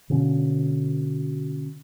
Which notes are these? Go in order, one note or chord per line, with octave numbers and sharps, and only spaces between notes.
B2 D3 A#3 C#4